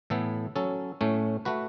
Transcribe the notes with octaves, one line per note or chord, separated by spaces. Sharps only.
A2 E3 B3 A4
F#3 C#4 A4
A2 A3 C#4
A3 F#4 B4